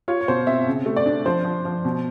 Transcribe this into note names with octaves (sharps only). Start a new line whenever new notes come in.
F4 C#5
C#5
B2 C5
C4 E5
C#3
A3
D5
D4
F3 C5
F3
F3
B2